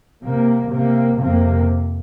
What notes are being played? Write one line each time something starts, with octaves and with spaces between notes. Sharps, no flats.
C3 A#3
C3 A#3
F2 C3 A#3